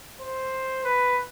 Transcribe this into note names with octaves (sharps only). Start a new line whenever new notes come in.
C5
B4